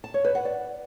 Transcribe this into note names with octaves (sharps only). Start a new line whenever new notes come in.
A5
C#5
B4
F#5
D5